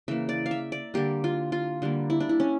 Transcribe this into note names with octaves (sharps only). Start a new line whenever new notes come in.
C#3 E3 A#3 E5
D5
F5
E5
D5
D3 G3 A#3 G4
F4
F4
D3 G3 A#3
E4
D4
E4
C#4